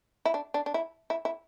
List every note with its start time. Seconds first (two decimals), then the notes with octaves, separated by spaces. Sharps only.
0.25 E4
0.34 D4
0.54 D4
0.66 D4
0.74 E4
1.10 E4
1.25 E4